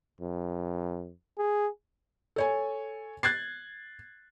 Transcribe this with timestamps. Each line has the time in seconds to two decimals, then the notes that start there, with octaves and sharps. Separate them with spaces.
0.20 F2
1.38 G#4
2.36 A4 C#5 G#5
3.23 F#6 G#6 A6 C7